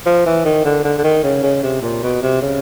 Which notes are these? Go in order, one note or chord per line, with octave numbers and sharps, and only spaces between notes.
F3
E3
D#3
D3
D3
D3
D#3
C#3
C#3
C3
A#2
B2
C3
C#3